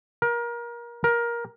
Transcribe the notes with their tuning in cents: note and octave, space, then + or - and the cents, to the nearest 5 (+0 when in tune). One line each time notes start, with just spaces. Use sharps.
A#4 +25
A#4 +15